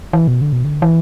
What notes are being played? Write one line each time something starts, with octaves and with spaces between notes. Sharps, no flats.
E3
B2
D3
B2
D3
E3